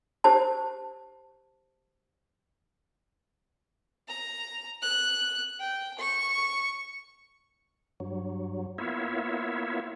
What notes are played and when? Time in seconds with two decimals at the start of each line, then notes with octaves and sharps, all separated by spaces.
0.24 G4 C5 A5
4.08 A#5
4.82 F#6
5.60 G5
5.98 C#6
8.00 G2 F#3
8.78 A#3 B3 E4 F4 C#5 E5